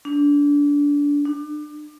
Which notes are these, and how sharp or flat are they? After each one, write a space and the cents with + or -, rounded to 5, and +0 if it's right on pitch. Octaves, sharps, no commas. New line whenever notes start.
D4 -25
D4 +30